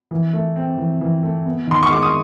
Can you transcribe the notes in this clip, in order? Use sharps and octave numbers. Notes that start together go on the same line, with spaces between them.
E3
A3
C4
E3
E3
A3
B3
D#3 C6
C#6
G#3 D6
D#6